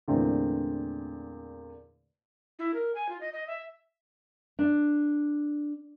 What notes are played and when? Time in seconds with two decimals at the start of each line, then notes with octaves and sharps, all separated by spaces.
0.08 E2 A#2 D3 A3 C4 D4
2.59 E4
2.74 A#4
2.95 G#5
3.09 F4
3.21 D#5
3.33 D#5
3.47 E5
4.59 D4